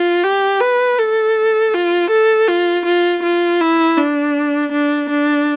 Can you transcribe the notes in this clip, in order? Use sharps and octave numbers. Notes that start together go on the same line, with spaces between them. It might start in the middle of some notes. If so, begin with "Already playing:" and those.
Already playing: F4
G4
B4
A4
F4
A4
F4
F4
F4
E4
D4
D4
D4